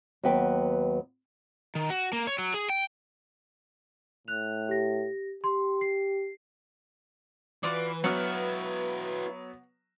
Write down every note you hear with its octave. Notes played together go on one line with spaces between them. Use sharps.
D#2 F#3 B3 B4 G5
D#3
F#4
A#3
C#5
F#3
G#4
G5
A2 F#6 F7
G4 A#6
G4 C6
C7
E3 F4 F#4 B4 D5
F#3 B3 E4 F#4 F#5 F6